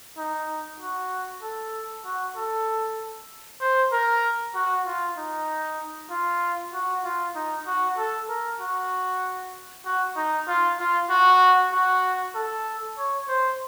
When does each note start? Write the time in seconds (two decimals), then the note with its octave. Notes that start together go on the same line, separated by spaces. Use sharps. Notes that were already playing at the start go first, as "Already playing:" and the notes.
0.18 D#4
0.80 F#4
1.42 A4
2.05 F#4
2.36 A4
3.61 C5
3.92 A#4
4.55 F#4
4.86 F4
5.17 D#4
6.11 F4
6.73 F#4
7.04 F4
7.36 D#4
7.67 F#4
7.98 A4
8.29 A#4
8.60 F#4
9.85 F#4
10.16 D#4
10.48 F4
10.79 F4
11.10 F#4
11.72 F#4
12.35 A4
12.98 C#5
13.28 C5